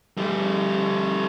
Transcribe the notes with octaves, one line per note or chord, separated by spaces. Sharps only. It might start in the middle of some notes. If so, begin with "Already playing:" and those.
G3 A3